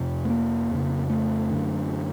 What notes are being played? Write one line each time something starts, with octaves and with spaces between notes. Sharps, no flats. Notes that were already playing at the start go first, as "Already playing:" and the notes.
Already playing: F2 C3
A3
A#3
F2 C#3
A3
F#2 D3